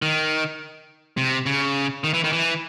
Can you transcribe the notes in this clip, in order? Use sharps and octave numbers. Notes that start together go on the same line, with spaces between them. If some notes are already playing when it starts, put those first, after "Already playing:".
D#3
C3
C#3
D#3
E3
D#3
E3